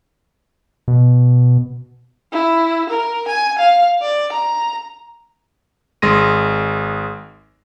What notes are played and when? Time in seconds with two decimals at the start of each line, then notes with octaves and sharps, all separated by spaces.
0.88 B2
2.32 E4
2.90 A#4
3.28 G#5
3.59 F5
4.02 D5
4.32 A#5
6.02 G#1 G#3 C6 A#6 D#7